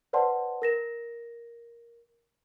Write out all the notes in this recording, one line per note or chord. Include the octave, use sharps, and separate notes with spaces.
B4 C5 D5 F#5 A5 C6
A#4 A#6 E7